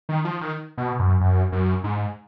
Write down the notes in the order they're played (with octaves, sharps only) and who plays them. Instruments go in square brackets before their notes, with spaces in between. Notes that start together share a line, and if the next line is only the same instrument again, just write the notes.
[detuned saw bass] D#3
F3
D#3
B2
F#2
F#2
F#2
G#2